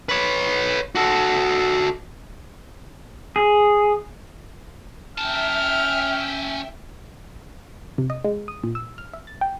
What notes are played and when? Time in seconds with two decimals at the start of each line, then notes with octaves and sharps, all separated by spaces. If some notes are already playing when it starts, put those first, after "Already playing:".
0.09 B4 C#5
0.95 F#4 A4
3.36 G#4
5.18 C#4 E5 G5 A5 F6
7.98 C3
8.10 D#5
8.25 G#3
8.48 D#6
8.63 A#2
8.75 E6
8.98 F6
9.13 E5
9.27 A6
9.41 G5